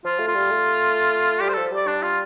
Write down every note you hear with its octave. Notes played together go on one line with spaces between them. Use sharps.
F3 F4
A3
F4
G3
A3
G3 G4
C5
F3 A4
G3 D5
D4
F4